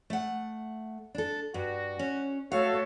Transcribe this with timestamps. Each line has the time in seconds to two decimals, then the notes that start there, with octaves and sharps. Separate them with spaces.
0.10 A3 F#5
1.15 D4 A4
1.54 G2 F#4
1.99 C#4
2.52 A3 F#4 A4 C#5 F5